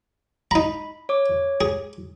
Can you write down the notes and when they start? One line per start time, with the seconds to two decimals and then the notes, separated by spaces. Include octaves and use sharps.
0.51 D#4 A#5 B5
1.09 C#5 D6
1.61 G#4